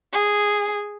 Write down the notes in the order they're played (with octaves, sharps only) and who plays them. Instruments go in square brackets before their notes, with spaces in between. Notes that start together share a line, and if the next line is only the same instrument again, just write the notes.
[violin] G#4